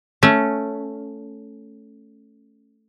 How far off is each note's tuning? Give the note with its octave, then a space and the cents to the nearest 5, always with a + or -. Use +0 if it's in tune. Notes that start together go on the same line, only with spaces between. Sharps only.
A3 +0 C#4 +0